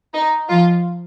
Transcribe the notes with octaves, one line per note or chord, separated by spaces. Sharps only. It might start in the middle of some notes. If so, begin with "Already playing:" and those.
D#4
F3 F4